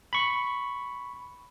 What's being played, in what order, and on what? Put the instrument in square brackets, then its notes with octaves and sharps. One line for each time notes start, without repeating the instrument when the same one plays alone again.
[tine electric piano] B5 C#6